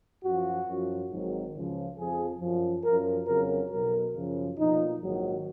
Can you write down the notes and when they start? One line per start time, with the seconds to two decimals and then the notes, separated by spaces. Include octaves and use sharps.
0.24 F#2 F3 F#4
0.67 F#2 F3
1.10 G#1 G#2 D#3 F#3
1.54 C#2 C#3 F3
1.97 F2 F3 G#4
2.40 F#2 F3
2.84 F#2 F3 A#4
3.27 F2 C#3 F#3 A#4
3.71 B1 B2 F#3 A#4
4.14 F#2 C#3 F3
4.57 B1 A#2 F3 D#4
5.00 A#1 G#2 D#3 F#3